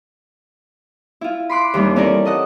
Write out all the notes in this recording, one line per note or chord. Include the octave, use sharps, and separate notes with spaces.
E4 F4
B5 C6 D6 F#6
D#2 E3 G3 A#3 D4
C4 C#4 E4 A4 A#4 D5
A4 D#5 F#5